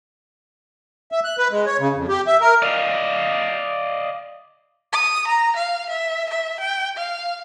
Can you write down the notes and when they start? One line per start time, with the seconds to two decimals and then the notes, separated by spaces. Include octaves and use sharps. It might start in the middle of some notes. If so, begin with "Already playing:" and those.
1.12 E5
1.24 F#6
1.38 B4
1.51 G#3
1.66 C#5
1.79 C#3
1.95 F2
2.09 G4
2.27 E5
2.41 A#4
2.62 D5 D#5 F5
4.93 D#6
5.28 A#5
5.56 F5
5.90 E5
6.30 E5
6.60 G5
6.97 F5